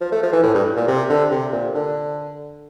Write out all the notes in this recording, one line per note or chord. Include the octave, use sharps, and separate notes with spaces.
F3
A3
F3
E3
A2
G2
A#2
C3
D3
C3
A#2
D3